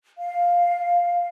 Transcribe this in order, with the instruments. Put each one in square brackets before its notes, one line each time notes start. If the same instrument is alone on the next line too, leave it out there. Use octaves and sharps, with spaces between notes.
[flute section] F5